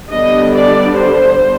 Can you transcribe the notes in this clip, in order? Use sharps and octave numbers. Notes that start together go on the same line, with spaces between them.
D3 G3 B3 D4 D#5
D5
C5